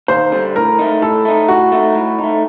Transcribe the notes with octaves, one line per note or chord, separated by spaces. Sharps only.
D#2 C5
D3 G3
A2 A#4
A3 D#4
A2 A4
A3 D#4
A2 F#4
A3 D#4
A2
A3 D#4